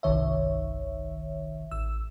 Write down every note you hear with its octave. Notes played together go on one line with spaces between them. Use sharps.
G1 C2 D#3 C#5 E5
A1 E6